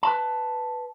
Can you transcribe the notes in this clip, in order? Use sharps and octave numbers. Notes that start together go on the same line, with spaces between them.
B4 A5